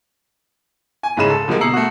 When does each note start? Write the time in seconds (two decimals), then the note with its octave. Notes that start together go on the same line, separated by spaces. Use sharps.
1.03 G#5
1.17 C2 G#2 C#3 G#3 B5 E7
1.30 A4
1.48 D3 F3 G3 G#3 A#3
1.60 B2 A#5 E6 C7 C#7 F#7
1.73 A3 F#4